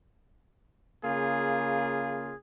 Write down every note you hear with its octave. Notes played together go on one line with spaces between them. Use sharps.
C#3 A#3 F4 G#4